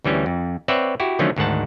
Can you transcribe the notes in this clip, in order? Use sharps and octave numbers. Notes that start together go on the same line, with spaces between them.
D2 E3 G3 C#4
F2
C4 B4 C#5 D5 E5 F#5
E4 F#4 G4
D3 D#3 F3 F#3 A3 C#4
D2 G#2 D#3 F#5 A5